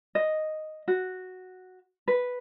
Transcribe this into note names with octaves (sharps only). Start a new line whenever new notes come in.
D#5
F#4
B4